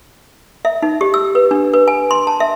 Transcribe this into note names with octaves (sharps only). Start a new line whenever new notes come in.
E5
D#4
G4
E6
B4
D4
B4
G#5
C6
A5
E5